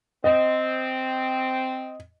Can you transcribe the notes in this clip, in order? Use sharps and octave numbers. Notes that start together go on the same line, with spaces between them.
C4 D#5